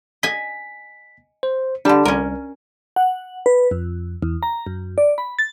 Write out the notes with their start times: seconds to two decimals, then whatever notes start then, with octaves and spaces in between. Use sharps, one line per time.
0.23 D#5 G#5 B6
1.43 C5
1.85 D3 G3 D4 G4 A5
2.05 C2 C#4 A#4
2.96 F#5
3.46 B4
3.71 F2
4.23 E2
4.43 A#5
4.66 F#2
4.98 D5
5.18 B5
5.39 A6